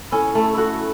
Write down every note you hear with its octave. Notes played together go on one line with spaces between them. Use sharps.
C#4 E4 A4
A3
E4 F#4 A4